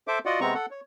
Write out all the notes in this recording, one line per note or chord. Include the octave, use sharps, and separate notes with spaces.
A4 C5 E5 D6
F4 F#4 D5 D#5 F#5
C3 G#3 B3 C4 A#5 C#6
A4 F#5
C#5